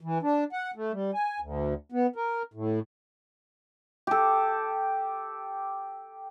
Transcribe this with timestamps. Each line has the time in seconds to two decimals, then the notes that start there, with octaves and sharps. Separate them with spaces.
0.01 E3
0.23 D4
0.53 F#5
0.76 A3
0.92 G3
1.14 G#5
1.40 D2
1.92 B3
2.16 A#4
2.54 A2
4.07 G4 A4